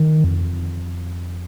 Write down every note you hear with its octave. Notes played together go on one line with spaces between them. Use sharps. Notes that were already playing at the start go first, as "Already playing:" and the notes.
Already playing: D#3
F2